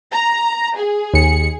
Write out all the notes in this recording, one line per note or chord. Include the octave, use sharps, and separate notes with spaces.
A#5
G#4
D#2 C#7